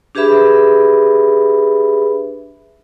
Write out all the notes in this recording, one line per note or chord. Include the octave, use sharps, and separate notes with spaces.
D4 G4 G#4 B4 E5 B5